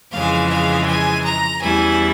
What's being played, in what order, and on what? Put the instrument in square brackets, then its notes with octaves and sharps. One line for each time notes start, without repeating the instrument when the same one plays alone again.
[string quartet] F2 C#3 E3 G#3 F5
F5
G#5
A#5
E2 E3 G3 C#4 E4 G#5